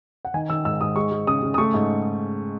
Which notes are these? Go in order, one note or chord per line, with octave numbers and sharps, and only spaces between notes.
F#5
D#3 G#5
D#3 E6
G#2 E6
G#2 D#6
G#3 C#6
G#3
C#3 D#6
C#3
D#6
A3 C#6
G#2